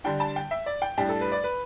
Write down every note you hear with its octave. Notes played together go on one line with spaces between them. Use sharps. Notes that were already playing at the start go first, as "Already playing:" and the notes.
D3 G3 D4 G5
A5
G5
E5
D5
G5
A2 G3 D4 G4
A4
B4
D5
B4